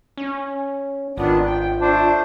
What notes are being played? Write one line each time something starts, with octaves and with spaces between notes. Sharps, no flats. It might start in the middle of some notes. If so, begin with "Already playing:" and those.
C#4
G#1 D#3 B3 D4 F4
G5
A3 D4 C5